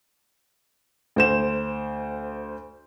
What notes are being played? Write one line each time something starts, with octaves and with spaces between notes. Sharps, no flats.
D2 C5 E7